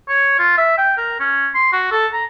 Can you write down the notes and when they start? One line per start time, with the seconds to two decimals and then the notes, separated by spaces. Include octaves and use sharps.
0.08 C#5
0.39 F4
0.58 E5
0.77 G5
0.98 A#4
1.20 C#4
1.54 C6
1.72 F#4
1.91 A4
2.13 A#5